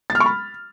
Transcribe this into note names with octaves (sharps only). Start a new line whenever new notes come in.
A6
F6
C#6
B5